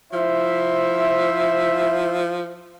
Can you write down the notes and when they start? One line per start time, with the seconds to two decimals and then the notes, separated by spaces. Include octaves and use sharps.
0.13 F3 E4 C5 E5